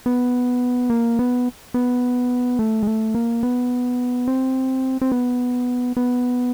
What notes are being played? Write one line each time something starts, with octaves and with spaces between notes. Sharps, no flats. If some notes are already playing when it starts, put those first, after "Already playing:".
B3
A#3
B3
B3
A3
G#3
A3
A#3
B3
C4
C4
B3
B3